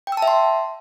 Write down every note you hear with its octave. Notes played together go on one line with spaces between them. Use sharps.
G5
E6
A5
E5
C6